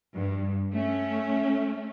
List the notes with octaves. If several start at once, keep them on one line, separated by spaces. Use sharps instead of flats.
G2
A3 C#4